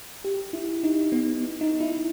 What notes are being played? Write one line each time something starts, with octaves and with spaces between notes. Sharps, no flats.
G4
E4
D#4
B3
D#4
E4